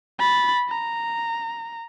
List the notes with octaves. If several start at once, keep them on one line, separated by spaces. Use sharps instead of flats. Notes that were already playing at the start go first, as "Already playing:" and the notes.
B5 A6
A#5